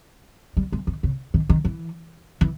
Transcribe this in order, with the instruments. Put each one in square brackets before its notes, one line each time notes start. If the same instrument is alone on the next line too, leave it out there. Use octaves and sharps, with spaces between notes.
[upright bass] G3
G#3
D#3
C#3
D#3
D#3
E3
E3